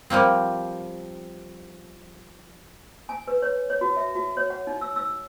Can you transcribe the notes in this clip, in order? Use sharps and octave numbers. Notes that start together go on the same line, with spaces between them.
F3 G3 A#3 C4
G#5
B4
C#5
C#5
F#4
E5
F#4
C#5
F#5
D#4
E6
E6